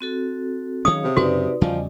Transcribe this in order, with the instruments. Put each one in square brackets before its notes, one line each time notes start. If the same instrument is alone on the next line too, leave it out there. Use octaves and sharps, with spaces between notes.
[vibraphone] C4 F#4 A4
[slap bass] D#3 F#3 C#4 [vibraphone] G#4 C#5 F5 [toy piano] D#6
[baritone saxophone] C3
[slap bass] F#2 C#3 [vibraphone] D#4 B4 D5 [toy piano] F#4
[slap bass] E2 C#3 G3 [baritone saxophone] F3 [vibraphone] D5 D#5 G#5